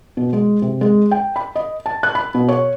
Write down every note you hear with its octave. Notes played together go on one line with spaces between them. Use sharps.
B2
G#3
C3
G#3
G5
B5
D#5
A5
F#6
B5
B2
C#5